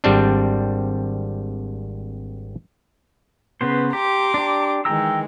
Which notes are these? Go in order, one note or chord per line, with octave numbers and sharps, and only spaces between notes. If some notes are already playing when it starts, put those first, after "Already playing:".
G#1 G3 C4 D4
C#3 B3 B4 C5
G4 A#5 C6 D6
D4 G4
D#3 E3 G#3 G5 A#5 E6